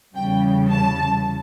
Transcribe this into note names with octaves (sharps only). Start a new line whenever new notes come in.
E2 C#3 E3 G3 G5
A5